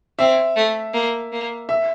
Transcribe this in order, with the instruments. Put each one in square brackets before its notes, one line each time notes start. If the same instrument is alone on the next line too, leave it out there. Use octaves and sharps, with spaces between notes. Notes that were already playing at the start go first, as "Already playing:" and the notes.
[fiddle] C4 [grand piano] E5
[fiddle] A3
A#3
A#3
[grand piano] E5